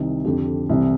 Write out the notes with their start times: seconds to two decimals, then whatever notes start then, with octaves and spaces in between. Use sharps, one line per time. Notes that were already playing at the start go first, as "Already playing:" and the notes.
Already playing: C2 C3 D#3
0.25 F2 D3 G4
0.69 C2 C3 E3